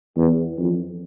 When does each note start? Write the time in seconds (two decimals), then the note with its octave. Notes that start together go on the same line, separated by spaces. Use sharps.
0.17 E2
0.58 F2